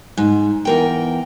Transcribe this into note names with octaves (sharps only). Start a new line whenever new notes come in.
G#2
E2 A#4 G5